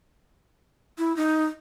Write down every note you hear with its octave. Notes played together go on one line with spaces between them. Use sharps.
E4
D#4